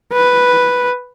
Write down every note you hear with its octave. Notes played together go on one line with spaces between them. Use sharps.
B4